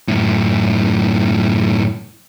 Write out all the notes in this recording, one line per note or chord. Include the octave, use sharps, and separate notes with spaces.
F#2 A2